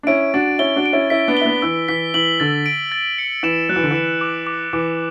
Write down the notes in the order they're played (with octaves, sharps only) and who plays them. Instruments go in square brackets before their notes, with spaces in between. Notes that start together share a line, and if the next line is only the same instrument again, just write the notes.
[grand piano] D4
[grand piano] C#4 E4 [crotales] D7
[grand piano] D4 F#4 [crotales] A6
[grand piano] C#4 E4 [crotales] G7
[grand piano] D4 F#4
[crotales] D7
[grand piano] C#4 E4
[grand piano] C#4 E4 [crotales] B6
[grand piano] B3 D4
[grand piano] E4 [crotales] G7
[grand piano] B3 D4
[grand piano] E3 [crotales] E6
[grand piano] E3 [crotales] B6
[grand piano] E3 [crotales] F#7
[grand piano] D3 [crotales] A6
[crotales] D7
A6
C#7
[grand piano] E3 [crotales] E7
[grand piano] F#3 [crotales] F#6
[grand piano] E3
D3
[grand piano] E3 [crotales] E7
[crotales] D6
D6
[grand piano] E3 [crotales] D6